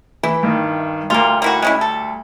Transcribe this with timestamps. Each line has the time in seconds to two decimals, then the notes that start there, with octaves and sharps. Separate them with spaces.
0.23 E3 E4
0.43 G2 D#3
1.10 D2 G3 A#3 F4
1.42 A#3 E4 F#4
1.62 G#3 C#4 E4
1.81 A4